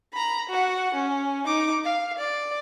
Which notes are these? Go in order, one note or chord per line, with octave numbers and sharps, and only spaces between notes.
A#5 B5
F#4 F#5
C#4
D#4 D6
F5
D5